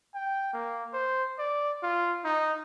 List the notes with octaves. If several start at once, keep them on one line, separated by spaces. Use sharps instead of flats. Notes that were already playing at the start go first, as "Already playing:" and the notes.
G5
A#3
C5
D5
F4
D#4